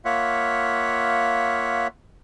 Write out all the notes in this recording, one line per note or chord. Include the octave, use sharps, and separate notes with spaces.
A#3 F4 C#5 E5 F#5